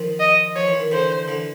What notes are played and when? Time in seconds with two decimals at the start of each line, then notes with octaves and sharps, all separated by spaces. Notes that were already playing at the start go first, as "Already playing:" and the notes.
Already playing: D#3 F3
0.20 D#5
0.56 F3 C#5
0.68 E3
0.80 D#3
0.91 D3 E3 C5
1.28 D3 E3